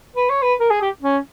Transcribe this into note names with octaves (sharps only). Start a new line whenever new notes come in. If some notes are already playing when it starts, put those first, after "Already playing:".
B4
C#5
B4
A#4
G#4
G4
C#4